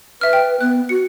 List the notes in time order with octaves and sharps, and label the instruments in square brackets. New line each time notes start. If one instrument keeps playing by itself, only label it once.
[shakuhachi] B4 [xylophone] E5 F6
[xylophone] G5
[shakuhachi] B3 [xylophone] F#6
[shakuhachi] F#4 [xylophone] C#7